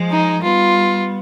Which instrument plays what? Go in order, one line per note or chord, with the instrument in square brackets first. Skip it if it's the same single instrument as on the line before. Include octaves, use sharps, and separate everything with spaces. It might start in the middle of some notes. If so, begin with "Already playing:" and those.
Already playing: [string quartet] F3 G#3
[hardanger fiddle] D#4
[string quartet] G3 B3 [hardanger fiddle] F4